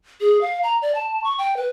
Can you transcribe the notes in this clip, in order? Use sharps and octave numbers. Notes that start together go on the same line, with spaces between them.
G#4
F5
A#5
D5
A5
C#6
G5
B4